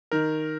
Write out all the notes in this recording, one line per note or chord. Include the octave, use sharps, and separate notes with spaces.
D#3 A#4